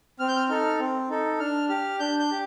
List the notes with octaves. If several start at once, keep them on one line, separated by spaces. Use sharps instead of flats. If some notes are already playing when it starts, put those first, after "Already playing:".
C4 F6
G6
F6
D#4 A4 F6
C4
D#4 A4
D4 F6
G4 F6
D4 G6
G6
G4